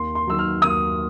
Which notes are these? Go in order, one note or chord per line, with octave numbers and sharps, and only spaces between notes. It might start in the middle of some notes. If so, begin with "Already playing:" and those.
Already playing: D#2 C6
C6
D#3 F#3 E6
F6
D#2 D#6